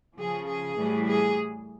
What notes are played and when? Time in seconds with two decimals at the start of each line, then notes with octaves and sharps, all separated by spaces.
0.17 C#3 F3 G#4
0.47 G#4
0.76 A2 E3 G3
1.06 G#4